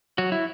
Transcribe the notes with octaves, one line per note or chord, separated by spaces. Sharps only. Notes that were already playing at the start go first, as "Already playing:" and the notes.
F#3 F#4
E4